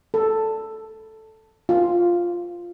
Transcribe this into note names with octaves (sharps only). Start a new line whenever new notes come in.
A4
F4